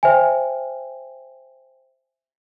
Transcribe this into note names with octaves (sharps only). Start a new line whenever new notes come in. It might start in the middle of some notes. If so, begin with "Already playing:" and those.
C5 E5 G5 G#5